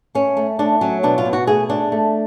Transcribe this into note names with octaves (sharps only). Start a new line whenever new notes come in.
A3 C#4
A3
A3 D4
F#3 C#4
B2 D4
F4
B2
F#4
A3 G#4
A3 D4
A3